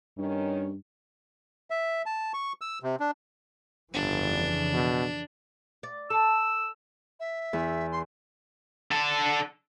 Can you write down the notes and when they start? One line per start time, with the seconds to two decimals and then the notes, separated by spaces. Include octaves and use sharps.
0.18 G2 D#3 C#4
1.70 E5
2.06 A5
2.34 C#6
2.61 E6
2.83 C3
3.00 D4
3.94 G1 F2 C#3 E3 D4
4.73 B2
5.83 D5
6.10 A4 E6
7.20 E5
7.53 E2
7.92 C6
8.91 D3 A4